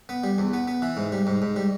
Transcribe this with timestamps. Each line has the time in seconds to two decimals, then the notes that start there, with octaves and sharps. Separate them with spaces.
0.09 B3
0.24 G3
0.38 E2
0.53 B3
0.68 B3
0.82 E3
0.97 G#2
1.12 G3
1.27 G#2
1.42 G#2
1.56 G3